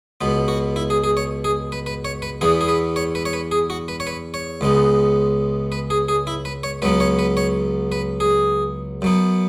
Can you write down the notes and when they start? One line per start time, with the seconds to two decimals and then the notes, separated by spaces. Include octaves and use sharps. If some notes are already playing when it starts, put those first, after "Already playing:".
0.21 C#2 B2 B3
0.48 F#4
0.76 E4
0.90 G#4
1.04 G#4
1.17 C#5
1.44 G#4
1.72 B4
1.86 B4
2.05 C#5
2.22 B4
2.41 E2 E3 B3 G#4
2.61 G#4
2.68 B4
2.96 C#5
3.15 B4
3.26 C#5
3.33 B4
3.52 G#4
3.70 F#4
3.88 B4
4.00 C#5
4.07 B4
4.34 C#5
4.61 C#2 C#3 G#3 B3
5.72 B4
5.90 G#4
6.09 G#4
6.27 E4
6.45 B4
6.63 C#5
6.82 C#2 C#3 F#3 B3 B4
7.00 C#5
7.19 B4
7.37 C#5
7.92 B4
8.20 G#4
9.02 F#2 F#3 B3